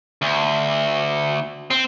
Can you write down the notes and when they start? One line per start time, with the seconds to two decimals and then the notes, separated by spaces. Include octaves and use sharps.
0.22 D2
1.71 C4